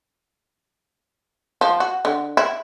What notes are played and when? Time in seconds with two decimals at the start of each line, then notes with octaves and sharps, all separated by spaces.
1.61 F3
1.80 F#4
2.05 D3
2.37 E4